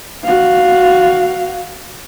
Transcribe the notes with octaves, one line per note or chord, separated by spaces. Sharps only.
F#4 F5